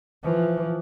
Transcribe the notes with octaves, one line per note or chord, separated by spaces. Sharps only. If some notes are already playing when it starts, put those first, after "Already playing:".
E3 F3